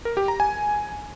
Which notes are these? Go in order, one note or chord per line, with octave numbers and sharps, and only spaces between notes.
A#4
G4
A#5
G#5